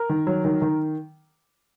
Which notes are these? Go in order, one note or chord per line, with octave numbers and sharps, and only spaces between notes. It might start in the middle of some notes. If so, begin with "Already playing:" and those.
Already playing: A#4
D#3
F#3
D#3
D#3